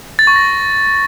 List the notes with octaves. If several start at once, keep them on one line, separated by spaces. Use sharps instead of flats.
A6
C#6
A#6